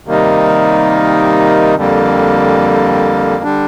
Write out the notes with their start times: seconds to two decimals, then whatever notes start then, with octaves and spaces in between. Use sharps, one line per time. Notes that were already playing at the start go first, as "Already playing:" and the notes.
0.07 C3 D#3 G3 A#3 D#4
1.75 F2 D3 G3 A#3
3.43 D3 G3 D4